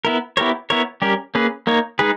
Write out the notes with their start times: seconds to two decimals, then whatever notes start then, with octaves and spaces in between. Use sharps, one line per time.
0.05 B3 E4 A#4
0.37 B3 E4 G4 A#4 C#5
0.70 B3 E4 A#4 C#5
1.02 G3 C#4 G4 A#4
1.35 A#3 C#4 G#4 B4
1.67 A#3 D#4 A#4 C#5
1.99 G#3 D#4 G#4 B4